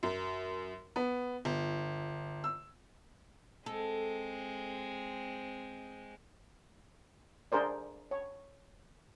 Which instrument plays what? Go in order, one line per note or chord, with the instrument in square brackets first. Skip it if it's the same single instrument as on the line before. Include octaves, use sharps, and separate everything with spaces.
[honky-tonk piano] F#2
B3
G1
E6
[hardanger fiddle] G#3 C4 [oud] A4
[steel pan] D4 G#4 A#4 C5 D5
C#5